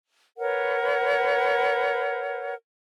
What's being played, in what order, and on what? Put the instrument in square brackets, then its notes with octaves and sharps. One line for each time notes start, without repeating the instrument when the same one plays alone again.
[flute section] A#4 B4 C#5 F#5